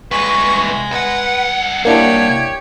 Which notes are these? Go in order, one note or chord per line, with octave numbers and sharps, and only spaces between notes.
C2 G#3 B4 C#6
C2 B4 F#5
A#3 D4 E4 G4 C#5 G#6